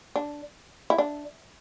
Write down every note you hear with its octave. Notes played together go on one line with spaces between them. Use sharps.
D4
E4
D4